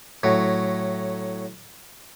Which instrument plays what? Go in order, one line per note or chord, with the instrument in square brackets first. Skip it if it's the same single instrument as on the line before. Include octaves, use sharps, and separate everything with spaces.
[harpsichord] A2 F#3